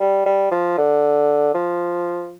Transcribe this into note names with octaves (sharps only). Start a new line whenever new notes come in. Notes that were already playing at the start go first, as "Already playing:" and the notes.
G3
G3
F3
D3
F3